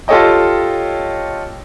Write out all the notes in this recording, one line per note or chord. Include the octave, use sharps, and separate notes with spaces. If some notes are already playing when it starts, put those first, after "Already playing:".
F4 G4 A4 C#5 D#5 G5